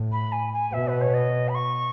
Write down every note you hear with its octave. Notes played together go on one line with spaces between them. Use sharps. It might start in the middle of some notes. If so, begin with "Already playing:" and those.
Already playing: A2
B5
G#5
G#5
B2 E5
B4
C#5
D#5
B5
C#6